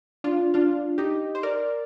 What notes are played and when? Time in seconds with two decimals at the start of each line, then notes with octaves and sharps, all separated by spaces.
0.24 D4 F4
0.54 D4 F4
0.98 D#4 G4
1.35 C5
1.43 A#4 D5